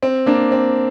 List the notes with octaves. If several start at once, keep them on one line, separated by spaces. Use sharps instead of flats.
C4
A#3 D4
C4